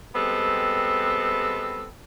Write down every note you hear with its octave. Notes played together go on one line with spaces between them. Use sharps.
G3 G#3 B3 C4 A4